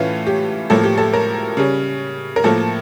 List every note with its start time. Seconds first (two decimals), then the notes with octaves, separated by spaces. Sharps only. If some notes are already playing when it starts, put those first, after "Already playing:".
Already playing: A2 E3 A3 C#4 F4
0.27 G4
0.70 A2 F3 A#3 A4
0.84 G4
0.98 A4
1.13 A#4
1.57 C#3 G3 C#4
2.36 A#4
2.44 A2 F3 A#3 A4